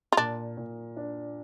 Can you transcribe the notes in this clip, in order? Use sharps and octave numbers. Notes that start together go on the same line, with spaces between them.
F4
A#2 D4
A#2
D4